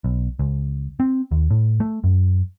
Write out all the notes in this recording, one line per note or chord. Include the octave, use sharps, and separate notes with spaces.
B1
C#2
C4
D#2
A2
A3
F#2